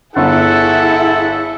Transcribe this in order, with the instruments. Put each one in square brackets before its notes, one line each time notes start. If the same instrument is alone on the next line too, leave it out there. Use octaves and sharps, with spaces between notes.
[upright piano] G1 [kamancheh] E4 G#4 [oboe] A4 [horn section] E5 F#5